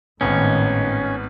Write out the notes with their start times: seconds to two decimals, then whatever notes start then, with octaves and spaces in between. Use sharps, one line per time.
0.21 G#1 A2 D#3 B3 C#4